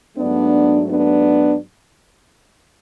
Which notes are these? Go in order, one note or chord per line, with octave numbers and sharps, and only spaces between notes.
G#2 F#3 A3 B3 D4
B3 D4